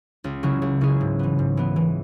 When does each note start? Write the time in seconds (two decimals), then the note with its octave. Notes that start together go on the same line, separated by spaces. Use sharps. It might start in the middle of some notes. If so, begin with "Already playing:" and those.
0.24 C#2
0.43 C#3 F#3 E4 G#4
0.62 C#2
0.81 C#3 F#3 E4 G#4
1.01 G#2
1.19 E3 B3
1.39 G#2
1.57 E3 B3
1.76 E3